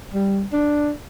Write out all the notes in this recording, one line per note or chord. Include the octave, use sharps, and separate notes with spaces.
G3
D4